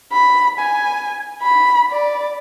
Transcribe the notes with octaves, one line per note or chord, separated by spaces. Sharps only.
B5
G#5
B5
D5